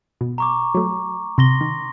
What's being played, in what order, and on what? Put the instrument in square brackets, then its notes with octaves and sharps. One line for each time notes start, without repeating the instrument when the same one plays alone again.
[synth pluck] B2
[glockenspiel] A#5 C#6 D6
[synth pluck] F#3 A3
[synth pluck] C3 [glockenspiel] C6 A#6 G7
[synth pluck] D#3